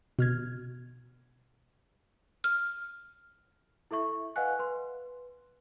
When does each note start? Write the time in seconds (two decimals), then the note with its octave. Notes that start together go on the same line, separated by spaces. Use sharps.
0.19 B2 F6 G#6
2.44 F6
3.91 E4 A4 E5 C#6
4.36 B4 D#5 F5 F#5 G#5 F#6
4.59 B4 C6